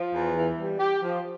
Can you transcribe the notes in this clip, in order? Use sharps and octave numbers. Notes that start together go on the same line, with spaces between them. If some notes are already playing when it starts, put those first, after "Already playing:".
Already playing: F3
E2
E3
G3
G4
F3